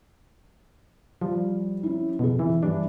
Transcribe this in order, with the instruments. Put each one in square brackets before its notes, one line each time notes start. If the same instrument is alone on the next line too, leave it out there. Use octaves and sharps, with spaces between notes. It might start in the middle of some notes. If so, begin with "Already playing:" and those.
[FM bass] F3 [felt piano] G3
[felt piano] C#4 E4
[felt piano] F2 G#4 [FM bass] B2
[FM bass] E3
[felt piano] G2 E3 G3 [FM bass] D4